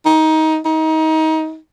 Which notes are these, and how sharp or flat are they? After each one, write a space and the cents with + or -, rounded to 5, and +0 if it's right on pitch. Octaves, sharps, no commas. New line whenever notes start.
D#4 +20
D#4 +25